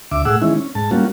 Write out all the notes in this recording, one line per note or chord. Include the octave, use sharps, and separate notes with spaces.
D2 E5 D6
A2 G#4 F#5 E6
D#3 E3 G#3 C#4 E4
C#4
G#2 A5
G3 A#3 C#4 F4 F#4